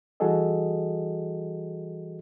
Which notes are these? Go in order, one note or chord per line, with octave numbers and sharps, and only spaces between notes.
E3 G3 F#4 G#4 A4 D#5